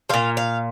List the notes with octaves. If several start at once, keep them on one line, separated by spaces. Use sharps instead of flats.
A#2 F3 F5
F5